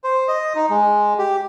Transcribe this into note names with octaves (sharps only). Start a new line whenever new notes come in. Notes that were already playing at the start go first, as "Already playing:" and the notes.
C5
D#5
D#4
G#3
G4